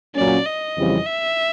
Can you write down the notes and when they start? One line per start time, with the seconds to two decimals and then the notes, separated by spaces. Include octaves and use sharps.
0.15 A#2 F#3 A#3 C#4 D5
0.46 D#5
0.76 F2 C#3 E3 G3 C4
1.06 E5